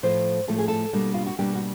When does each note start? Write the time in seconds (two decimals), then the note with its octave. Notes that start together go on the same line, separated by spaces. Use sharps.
0.03 A2 F3 A3 C5
0.47 A2 F3 A3 A4
0.58 G#4
0.68 A4
0.93 B2 G3 A#3 D4
1.14 F4
1.26 F#4
1.38 B2 G3 A#3 D4 G4
1.55 F#4